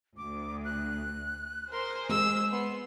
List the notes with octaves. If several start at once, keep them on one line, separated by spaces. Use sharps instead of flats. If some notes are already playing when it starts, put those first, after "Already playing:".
D2 D6
F#6
G#4 A#4 C5 C6
G#3 E6
B3 C6